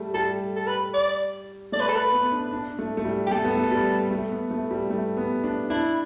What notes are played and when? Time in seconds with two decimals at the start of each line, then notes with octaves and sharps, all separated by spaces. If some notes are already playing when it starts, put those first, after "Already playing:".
Already playing: G3 A3
0.14 G3 A4
0.56 A4
0.67 B4
0.94 D5
1.72 A3 D5
1.80 B4
1.89 A4
1.96 B4
2.12 B3
2.32 D4
2.53 D4
2.79 A3
2.97 A3
3.05 G3
3.27 G4
3.31 A3 A4
3.45 B3
3.57 A3
3.71 G3
4.11 A3
4.31 B3
4.51 A3
4.71 G3
4.90 A3
5.17 B3
5.44 D4
5.70 D4 E4